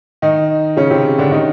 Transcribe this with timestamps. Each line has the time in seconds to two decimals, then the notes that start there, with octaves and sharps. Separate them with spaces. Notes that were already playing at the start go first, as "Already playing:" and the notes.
0.22 D#3 D#4
0.77 C#3 C#4
0.91 C3 C4
1.18 D3 D4
1.32 D#3 D#4